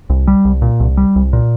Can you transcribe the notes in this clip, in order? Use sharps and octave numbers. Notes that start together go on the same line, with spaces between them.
C2
G3
C2
A#2
C2
G3
C2
A#2